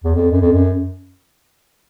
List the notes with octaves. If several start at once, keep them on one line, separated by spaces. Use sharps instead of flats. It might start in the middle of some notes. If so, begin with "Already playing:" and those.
E2
F2
F#2
F2
F#2